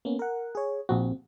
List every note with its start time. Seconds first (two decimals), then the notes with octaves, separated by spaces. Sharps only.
0.05 A#3 B3 C#4
0.19 A#4 F#5
0.55 G#4 C#5
0.89 A#1 C4 F#4